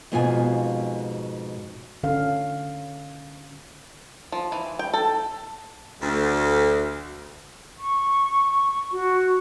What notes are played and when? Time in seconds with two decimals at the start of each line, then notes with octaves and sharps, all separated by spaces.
0.12 F2 G#2 B2 F4 G#4 G#5
2.03 D3 C#4 A4 F5
4.32 F3
4.52 E3
4.79 G5
4.94 A4
6.00 D2
7.79 C#6
8.92 F#4